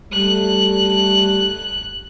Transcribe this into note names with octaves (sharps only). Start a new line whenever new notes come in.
G3 A3 F#6